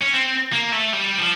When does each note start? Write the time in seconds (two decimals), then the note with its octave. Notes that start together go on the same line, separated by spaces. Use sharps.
0.02 C#4
0.14 C4
0.53 A#3
0.72 A3
0.93 G3
1.19 F3